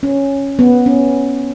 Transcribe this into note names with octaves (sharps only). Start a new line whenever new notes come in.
C#4
B3
C#4